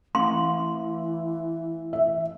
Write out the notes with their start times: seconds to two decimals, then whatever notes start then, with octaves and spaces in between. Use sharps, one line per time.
0.15 E3 A3 C6
1.93 E5